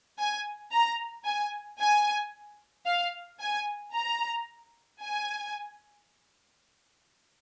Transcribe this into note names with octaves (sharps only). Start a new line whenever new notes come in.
G#5
A#5
G#5
G#5
F5
G#5
A#5
G#5